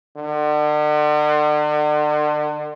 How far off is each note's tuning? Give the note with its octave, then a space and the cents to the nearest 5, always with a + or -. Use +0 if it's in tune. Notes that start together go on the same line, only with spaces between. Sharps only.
D3 +40